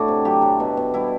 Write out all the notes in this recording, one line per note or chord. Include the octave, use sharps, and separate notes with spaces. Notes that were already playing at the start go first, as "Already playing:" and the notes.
Already playing: A2 D4 E4 F#4
C3
F#3 G4
F#3
B2
B2
G3 E4